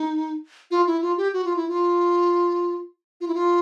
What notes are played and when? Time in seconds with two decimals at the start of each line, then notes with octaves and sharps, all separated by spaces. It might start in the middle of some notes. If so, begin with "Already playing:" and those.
Already playing: D#4
0.71 F4
0.87 E4
1.02 F4
1.17 G4
1.33 F#4
1.45 F4
1.56 E4
1.68 F4
3.21 F4
3.28 E4
3.35 F4